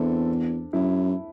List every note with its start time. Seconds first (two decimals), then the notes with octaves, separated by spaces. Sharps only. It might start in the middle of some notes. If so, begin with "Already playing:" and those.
Already playing: E2 C4 D4 E4 A4
0.73 F#2 E4